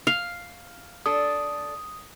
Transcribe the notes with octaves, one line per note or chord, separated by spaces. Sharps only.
F5
D4 A4 D#6